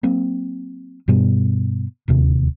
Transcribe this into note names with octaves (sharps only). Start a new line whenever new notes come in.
F#3 A#3 C4
G2 B2 G3 B3
D1 D#2 C3